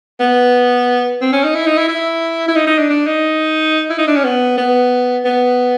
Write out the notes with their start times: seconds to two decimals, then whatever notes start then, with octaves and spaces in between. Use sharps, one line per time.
0.20 B3
1.21 C4
1.32 C#4
1.44 D#4
1.55 E4
1.66 D#4
1.77 E4
1.88 E4
2.48 E4
2.56 D#4
2.66 D#4
2.78 D4
2.89 D4
3.06 D#4
3.90 E4
3.98 D#4
4.07 D4
4.16 C#4
4.24 B3
4.57 B3
5.25 B3